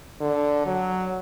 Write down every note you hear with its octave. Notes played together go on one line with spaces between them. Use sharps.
D3
F#3